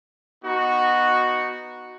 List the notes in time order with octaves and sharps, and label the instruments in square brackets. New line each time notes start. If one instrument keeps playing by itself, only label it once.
[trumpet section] B3 D#4 F#4